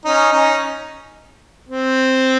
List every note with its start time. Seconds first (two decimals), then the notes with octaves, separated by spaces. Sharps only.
0.05 C#4 D#4
0.32 C#4 D#4
1.69 C4